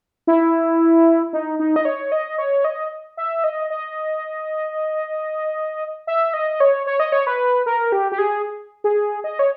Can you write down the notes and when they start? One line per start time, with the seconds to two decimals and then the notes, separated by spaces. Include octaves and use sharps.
0.27 E4
1.33 D#4
1.59 D#4
1.76 D#5
1.85 C#5
2.12 D#5
2.38 C#5
2.64 D#5
3.17 E5
3.44 D#5
3.70 D#5
6.07 E5
6.34 D#5
6.60 C#5
6.86 C#5
7.00 D#5
7.12 C#5
7.27 B4
7.66 A#4
7.92 G4
8.12 G4
8.18 G#4
8.84 G#4
9.24 D#5
9.39 C#5